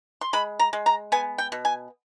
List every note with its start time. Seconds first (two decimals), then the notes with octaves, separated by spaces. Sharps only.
0.21 C6
0.33 G#3 B5
0.59 A#5
0.73 G#3
0.86 A#5
1.12 B3 G#5
1.38 G5
1.52 B2
1.65 G#5